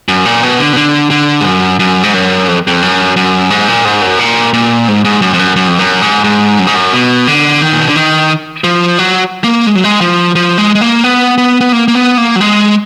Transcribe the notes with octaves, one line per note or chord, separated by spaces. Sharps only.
F#2
A#2
B2
D3
B2
D3
D3
G#2
F#2
F#2
G#2
F#2
F2
F2
F#2
F#2
G#2
A#2
G#2
F#2
A#2
A#2
G#2
G#2
F#2
F2
F#2
F#2
F2
F#2
G#2
G#2
F#2
G#2
F#2
B2
D3
D#3
A#2
B2
D3
D#3
F3
F#3
A#3
G#3
F#3
G#3
F3
F3
G#3
G#3
A#3
B3
B3
B3
A#3
A#3
B3
A#3
F#3
G#3